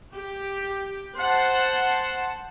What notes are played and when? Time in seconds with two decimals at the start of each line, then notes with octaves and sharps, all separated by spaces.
0.14 G4
1.17 C5 F#5 A5